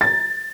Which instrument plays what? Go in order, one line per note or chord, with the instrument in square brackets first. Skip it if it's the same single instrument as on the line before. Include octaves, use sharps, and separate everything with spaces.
[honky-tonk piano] A6